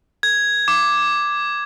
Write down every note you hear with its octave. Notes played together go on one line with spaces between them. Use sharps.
G#6
D6